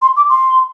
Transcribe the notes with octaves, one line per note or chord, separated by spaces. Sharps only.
C6
D6
C6